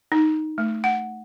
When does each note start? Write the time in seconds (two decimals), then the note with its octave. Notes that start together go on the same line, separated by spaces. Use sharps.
0.12 D#4
0.58 A3
0.84 F#5